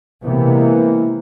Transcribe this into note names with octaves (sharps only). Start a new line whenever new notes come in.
C3 E3 G#3 A#3 B3